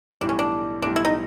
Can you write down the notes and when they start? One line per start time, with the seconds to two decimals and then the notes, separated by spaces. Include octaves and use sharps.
0.21 B1 A2 E3 G3 D4
0.29 C#4
0.39 D4
0.82 B1 A2 E3 G3 D4
0.96 E4
1.05 D#4